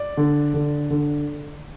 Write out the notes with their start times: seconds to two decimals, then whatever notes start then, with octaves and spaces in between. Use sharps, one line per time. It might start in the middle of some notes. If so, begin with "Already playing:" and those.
Already playing: D5
0.17 D3
0.54 D3
0.90 D3